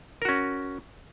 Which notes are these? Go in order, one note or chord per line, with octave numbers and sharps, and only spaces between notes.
C#4 F#4 A#4